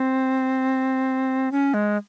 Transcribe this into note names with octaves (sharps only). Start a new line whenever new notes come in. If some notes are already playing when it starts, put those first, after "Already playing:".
Already playing: C4
C#4
G#3